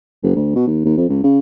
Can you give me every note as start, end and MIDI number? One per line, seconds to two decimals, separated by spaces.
0.23 0.34 30
0.36 0.53 38
0.55 0.66 47
0.67 0.80 39
0.85 0.96 39
0.97 1.07 41
1.09 1.19 37
1.24 1.39 49